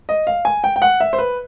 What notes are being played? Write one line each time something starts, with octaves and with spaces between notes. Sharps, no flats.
D#5
F5
G#5
G5
G5
F#5
E5
C5
B4